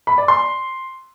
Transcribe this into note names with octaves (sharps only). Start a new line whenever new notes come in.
B5
D5
C6